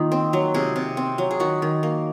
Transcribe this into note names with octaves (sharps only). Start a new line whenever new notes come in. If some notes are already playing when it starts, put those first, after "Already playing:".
Already playing: D#3 A#3 D#4 F4
C4
F#3
C3 G#4
C3
C4
F#3
G#4
D#3 F#4
D#3
A#3